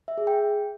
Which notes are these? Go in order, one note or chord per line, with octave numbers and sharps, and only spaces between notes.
E5
G#4
G5